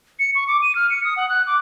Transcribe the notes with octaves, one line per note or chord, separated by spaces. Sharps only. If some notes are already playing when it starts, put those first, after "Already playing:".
C#7
C#6
D6
D#7
F6
C#7
D#6
F#5
F#6
D6